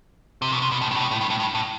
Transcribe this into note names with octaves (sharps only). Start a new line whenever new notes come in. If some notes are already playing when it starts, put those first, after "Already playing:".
C3
B2
C3
B2
A2
G2
A2
B2
A2
G2
A2
G2
A2